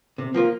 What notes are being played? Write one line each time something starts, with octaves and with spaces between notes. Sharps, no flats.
C3
F3 A#3 F4